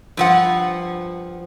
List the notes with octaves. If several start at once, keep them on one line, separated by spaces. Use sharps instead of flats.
G2 F3 F#5